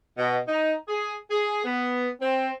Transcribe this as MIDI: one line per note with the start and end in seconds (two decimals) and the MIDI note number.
0.17 0.38 47
0.48 0.74 63
0.88 1.16 68
1.31 1.62 68
1.65 2.08 59
2.21 2.50 60